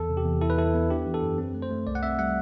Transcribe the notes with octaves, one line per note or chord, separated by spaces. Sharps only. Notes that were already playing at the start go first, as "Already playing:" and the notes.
Already playing: E2 A4
C3
G4
E2
E4 A4
B4
E4 A4
B3
D4 G4
E3
A4
F#2
C4
A3
C5
A3
C2 D5
F#5
C4 E5
G3 F#5